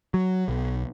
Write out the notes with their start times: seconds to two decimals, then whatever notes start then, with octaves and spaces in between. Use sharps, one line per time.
0.14 F#3
0.48 B1